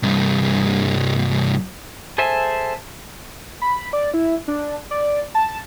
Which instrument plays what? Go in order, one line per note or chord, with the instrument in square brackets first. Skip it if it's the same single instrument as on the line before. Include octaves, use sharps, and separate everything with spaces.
[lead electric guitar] C2 G2
[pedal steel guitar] G#4 A4 C5 E5 G#5
[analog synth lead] B5
D5
E4
D4
D5
A5